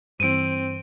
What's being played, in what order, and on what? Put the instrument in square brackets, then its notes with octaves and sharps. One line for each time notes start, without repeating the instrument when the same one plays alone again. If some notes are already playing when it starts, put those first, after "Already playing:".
[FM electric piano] G2 E3 [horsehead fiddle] C4 [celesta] D7 D#7